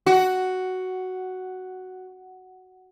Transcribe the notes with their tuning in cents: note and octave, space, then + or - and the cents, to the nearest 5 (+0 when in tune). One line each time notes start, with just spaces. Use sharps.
F#4 +5